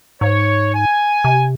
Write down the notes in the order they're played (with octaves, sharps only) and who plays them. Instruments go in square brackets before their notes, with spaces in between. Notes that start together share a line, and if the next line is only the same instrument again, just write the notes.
[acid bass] G#2 [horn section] C#5
[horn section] G#5
[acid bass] C3